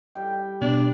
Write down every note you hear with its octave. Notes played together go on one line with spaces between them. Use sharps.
G3 G5
B2 D4